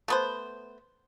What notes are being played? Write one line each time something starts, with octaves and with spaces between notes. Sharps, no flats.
A3 B3 C5